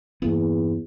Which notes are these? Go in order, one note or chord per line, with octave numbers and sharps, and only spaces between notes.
E2 G2 A#3 B3